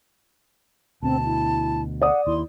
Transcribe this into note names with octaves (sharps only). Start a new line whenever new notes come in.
D2 B2 C4 A5
E4
D5 F#5 D#6
D#2 E4 C6